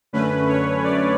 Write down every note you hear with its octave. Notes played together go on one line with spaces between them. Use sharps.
F#2 D3 A3 C#4 B4
C#5
D5